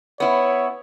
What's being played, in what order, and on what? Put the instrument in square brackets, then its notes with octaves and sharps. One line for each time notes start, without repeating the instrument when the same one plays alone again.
[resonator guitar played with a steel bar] B3 E4 [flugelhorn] C#5